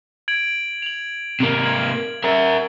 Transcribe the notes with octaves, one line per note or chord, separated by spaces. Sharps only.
G#6 D7 F#7
F7 F#7
C3 A#3
G#6 F#7
A#4 E5